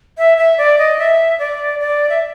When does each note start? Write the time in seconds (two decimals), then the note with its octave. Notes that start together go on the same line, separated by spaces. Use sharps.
0.18 E5
0.38 E5
0.58 D5
0.78 D#5
0.98 E5
1.39 D5
1.79 D5
2.09 E5